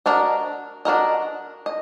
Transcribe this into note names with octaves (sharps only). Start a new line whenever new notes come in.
D4 F#4 A#4 D#5
D4 F#4 A#4 D#5
D#5